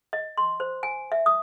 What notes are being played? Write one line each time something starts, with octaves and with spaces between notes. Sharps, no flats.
D#5
C6
C5
G#5
E5
D#6